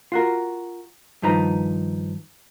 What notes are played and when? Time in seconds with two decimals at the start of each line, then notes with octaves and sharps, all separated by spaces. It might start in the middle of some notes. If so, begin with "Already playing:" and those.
0.12 F4 F#4 A#4
1.22 G2 D#3 F3 D#4 B4 A#5